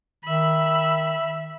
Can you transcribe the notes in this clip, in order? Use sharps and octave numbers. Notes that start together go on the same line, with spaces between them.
D#3 E5 B5